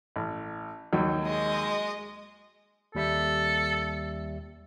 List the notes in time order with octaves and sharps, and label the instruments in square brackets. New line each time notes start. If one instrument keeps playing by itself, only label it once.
[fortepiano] A1
D#2 F#3 D#4
[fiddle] G#3 D#5
[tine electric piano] D#2 G3 E5 [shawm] A4